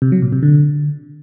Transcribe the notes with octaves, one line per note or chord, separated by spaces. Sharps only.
C3
F#3
A#2
C3
D3